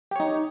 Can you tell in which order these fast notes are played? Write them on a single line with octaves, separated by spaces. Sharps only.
G4 C#5 D#4